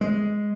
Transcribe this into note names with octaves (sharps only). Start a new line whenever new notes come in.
G#3